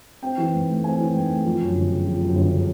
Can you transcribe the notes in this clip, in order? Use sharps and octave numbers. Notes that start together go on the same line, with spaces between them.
C4 G5
E3
G#2
A3
C4 G#5
E3
G#2 G5
A3
F3
F#2
G1
C#3
F3
F#2
G1
C#3